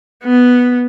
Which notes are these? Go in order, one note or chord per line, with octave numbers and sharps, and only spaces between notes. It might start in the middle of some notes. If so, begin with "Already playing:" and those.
B3